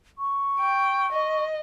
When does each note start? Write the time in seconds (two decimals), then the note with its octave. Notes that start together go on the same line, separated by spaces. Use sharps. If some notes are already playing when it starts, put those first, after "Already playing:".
0.19 C#6
0.60 G5
1.12 D#5